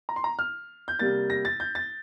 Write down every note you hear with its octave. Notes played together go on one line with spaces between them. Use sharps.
A#5
C6
A#5
F6
G6
C3 G3 A#3 A6
A#6
A6
G6
A6